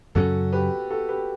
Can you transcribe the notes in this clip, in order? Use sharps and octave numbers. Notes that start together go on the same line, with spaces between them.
F#2 C#3 F#3 C#4 F#4 A4
G4 B4
F#4 A4
G4 B4